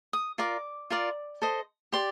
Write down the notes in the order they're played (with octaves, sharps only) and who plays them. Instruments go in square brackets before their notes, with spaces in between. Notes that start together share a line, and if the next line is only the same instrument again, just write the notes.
[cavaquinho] D#6
F4 A#4 D5 D6
F4 A#4 D5
A4 C5 D#5
G4 D5 C6